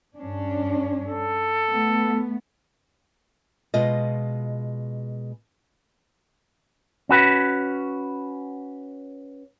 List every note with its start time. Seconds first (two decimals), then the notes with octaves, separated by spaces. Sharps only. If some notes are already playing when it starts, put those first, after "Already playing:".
0.18 G2 C#4 D4
1.07 A4
1.69 A3 B3
3.74 B2 G#3 F4 D#5
7.09 C#4 F#4 B4